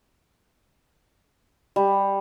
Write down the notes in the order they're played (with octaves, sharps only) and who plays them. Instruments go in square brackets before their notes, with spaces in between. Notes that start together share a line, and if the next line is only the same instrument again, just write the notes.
[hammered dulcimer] G3